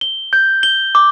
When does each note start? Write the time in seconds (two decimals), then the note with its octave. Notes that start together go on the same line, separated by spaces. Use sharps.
0.01 G7
0.33 G6
0.63 G7
0.95 D6